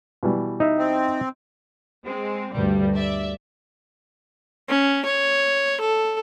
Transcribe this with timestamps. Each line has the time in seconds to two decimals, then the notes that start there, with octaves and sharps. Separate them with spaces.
0.23 B2 E3 G3
0.60 D#4 E5
0.78 C4
2.04 G#3 C4
2.52 D2 G2 G3
2.94 D5 E5
4.69 C#4
5.05 C#5
5.81 A4